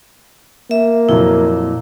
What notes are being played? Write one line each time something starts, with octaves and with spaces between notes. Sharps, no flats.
A#3 E5
F2 A#2 F#3 E4